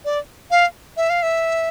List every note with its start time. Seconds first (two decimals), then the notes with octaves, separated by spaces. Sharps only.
0.05 D5
0.51 F5
0.97 E5
1.10 F5
1.23 E5